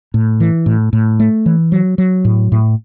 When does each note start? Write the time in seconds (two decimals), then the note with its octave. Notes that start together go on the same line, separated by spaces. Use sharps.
0.14 A2
0.40 E3
0.66 A2
0.93 A2
1.20 A3
1.46 E3
1.72 F#3
1.98 F#3
2.25 A2
2.52 A2